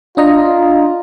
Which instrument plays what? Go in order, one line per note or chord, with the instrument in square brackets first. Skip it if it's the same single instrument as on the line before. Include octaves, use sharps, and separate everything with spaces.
[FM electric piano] D4 D#5 A#5 [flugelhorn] F4